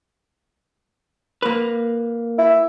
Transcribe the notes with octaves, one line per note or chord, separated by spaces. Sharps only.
A#3 B4
E4